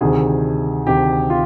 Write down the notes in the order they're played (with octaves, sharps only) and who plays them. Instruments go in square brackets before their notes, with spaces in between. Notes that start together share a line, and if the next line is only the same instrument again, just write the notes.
[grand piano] D2 C3 D#3 G#4
D2 C3 D#3 G4
F4